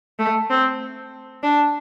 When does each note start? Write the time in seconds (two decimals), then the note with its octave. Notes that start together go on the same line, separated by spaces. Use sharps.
0.19 A3
0.50 C4
1.43 D4